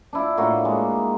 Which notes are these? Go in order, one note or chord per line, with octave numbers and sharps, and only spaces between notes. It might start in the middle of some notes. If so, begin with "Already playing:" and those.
D4 E4 F4
A2 A#3 F4 F#4
G#3